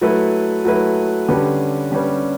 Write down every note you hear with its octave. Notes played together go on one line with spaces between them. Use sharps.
F#3 A3 E4 B4
F#3 A3 E4 B4
D3 G3 C#4 G4 B4
D3 G3 C#4 G4 B4